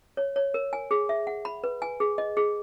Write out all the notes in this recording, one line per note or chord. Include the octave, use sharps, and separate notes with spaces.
C#5
C#5
A#4
G#5
G#4
E5
F#5
B5
B4
G#5
G#4
D#5
G#4